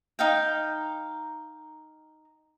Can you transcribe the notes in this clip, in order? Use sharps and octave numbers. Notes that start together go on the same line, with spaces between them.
D#4 F5 G5